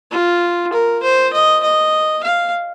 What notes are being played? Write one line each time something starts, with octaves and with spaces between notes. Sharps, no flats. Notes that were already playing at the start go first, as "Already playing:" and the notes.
F4
A#4
C5
D#5
D#5
F5